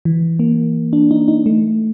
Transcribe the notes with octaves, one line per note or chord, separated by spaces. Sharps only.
E3
A#3
D4
D#4
D#4
A3